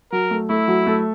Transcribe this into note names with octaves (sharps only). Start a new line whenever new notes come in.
F#3 A#4
A3
A3 E4
F#3
A3